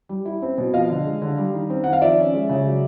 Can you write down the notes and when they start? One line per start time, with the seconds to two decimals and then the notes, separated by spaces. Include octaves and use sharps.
0.09 G3
0.25 E4
0.42 C4
0.58 B2
0.74 F3 D#5 F5
0.90 D3
1.05 G#3
1.22 D3
1.38 G3
1.54 D#3
1.70 C4
1.84 D#3 F#5
1.93 F5
2.01 F3 D5 E5
2.17 C#4
2.34 G#3
2.49 C#3
2.66 F#3